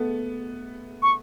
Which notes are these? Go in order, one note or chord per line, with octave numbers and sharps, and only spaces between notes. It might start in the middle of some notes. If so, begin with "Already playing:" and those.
Already playing: A3 B3
C#6